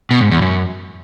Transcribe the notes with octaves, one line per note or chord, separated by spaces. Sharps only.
B2
G#2
E2
F#2